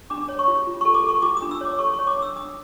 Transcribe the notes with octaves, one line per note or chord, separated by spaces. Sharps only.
D4 D6
C#5
C#6
F4
F4
C#6
A4
D6
A4
C#6
F4 D6
D#6
D4
E6
C#5 D6
A4 C#6
C#6
C#5
D6
D4
E6
D4 D#6